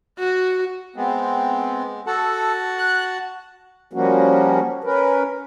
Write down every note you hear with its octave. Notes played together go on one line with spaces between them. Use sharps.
F#4
G#3 B3 C4
F#4 A4 F#5 A5
F#6
F3 G3 A#3 C#4 F#4
C#4 A#4 B4